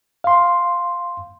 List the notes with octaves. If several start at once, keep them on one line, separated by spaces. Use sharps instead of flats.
F5 C6